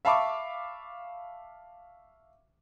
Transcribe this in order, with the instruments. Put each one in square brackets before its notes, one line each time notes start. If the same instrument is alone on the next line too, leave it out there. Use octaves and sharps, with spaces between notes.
[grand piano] E5 F5 A5 B5 C#6 D6